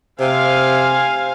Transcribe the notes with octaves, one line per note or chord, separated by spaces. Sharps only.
C3 C5 F5 G#5